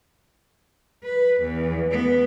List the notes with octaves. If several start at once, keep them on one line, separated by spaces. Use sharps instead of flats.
B4
E2
B3